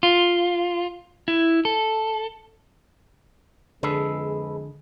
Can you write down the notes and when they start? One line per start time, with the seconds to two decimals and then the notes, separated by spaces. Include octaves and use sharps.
0.03 F4
1.28 E4
1.65 A4
3.83 F2 D3 G#3 G#4 A4 B4